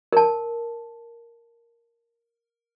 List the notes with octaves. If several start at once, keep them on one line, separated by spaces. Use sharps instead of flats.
A#4 A5